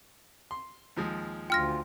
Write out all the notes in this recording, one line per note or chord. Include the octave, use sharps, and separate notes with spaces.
C6
D#2 F3 G#3
D2 F4 G5 F6 A#6